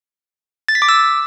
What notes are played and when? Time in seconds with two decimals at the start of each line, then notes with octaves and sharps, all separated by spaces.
0.68 A6
0.75 B6
0.82 D6
0.89 E6